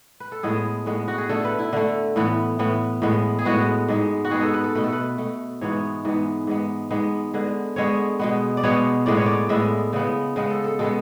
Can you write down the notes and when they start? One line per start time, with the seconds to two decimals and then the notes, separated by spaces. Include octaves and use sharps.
0.20 B4
0.32 A4
0.43 A2 G#3 B3 G#4
0.86 A2 G#3 B3
1.08 F#4
1.18 G#4
1.29 D3 A3 A4
1.45 B4
1.59 E4
1.73 D3 A3
2.16 A2 E3 B3
2.59 A2 E3 B3
3.02 A2 G#3 B3
3.39 G#4
3.45 A2 G#3 B3 F#4
3.88 G#2 G#3 B3
4.25 F#4
4.31 G#2 G#3 B3 G#4
4.42 A4
4.54 B4
4.64 A4
4.75 B2 A3 B4
4.84 A4
4.93 B4
5.18 B2 A3
5.61 G#2 E3 G#3 B3 C#5
6.05 G#2 E3 G#3 B3
6.47 G#2 G#3 B3
6.91 G#2 G#3 B3
7.34 D3 G#3 B3
7.76 D3 G#3 B3 C#5
8.19 B2 G#3 B3
8.57 D5
8.63 B2 G#3 B3 C#5
9.06 A2 G#3 B3 D5
9.17 C#5
9.26 D5
9.49 A2 G#3 B3 E5
9.93 C#3 G#3 B3
10.36 C#3 G#3 B3
10.51 A4
10.64 A4
10.79 B2 G#3 B3 A4